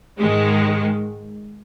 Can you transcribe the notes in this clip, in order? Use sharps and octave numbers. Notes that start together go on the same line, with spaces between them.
G#2 D#3 G#3